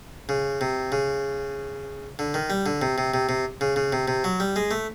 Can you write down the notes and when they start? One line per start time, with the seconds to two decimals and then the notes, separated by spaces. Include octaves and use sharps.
0.29 C#3
0.61 C3
0.92 C#3
2.19 D3
2.34 D#3
2.50 G3
2.66 D3
2.82 C3
2.98 C3
3.14 C3
3.29 C3
3.61 C#3
3.76 C#3
3.93 C3
4.08 C3
4.24 F#3
4.40 G3
4.56 G#3
4.71 A3